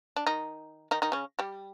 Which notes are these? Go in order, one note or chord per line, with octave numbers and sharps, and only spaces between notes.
D4
D#3 D#4
D#3 D#4
D#3 D#4
C#3 C#4
G3 G4